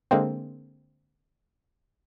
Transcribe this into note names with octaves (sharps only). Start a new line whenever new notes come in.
D3 G#3 A#3 C4